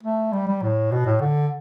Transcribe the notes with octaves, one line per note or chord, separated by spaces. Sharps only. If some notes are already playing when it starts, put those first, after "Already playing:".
A3
G3
G3
A2
B2
A2
D3